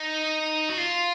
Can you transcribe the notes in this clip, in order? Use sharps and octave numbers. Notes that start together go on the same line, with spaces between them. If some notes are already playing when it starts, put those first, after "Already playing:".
Already playing: D#4
F#4
F4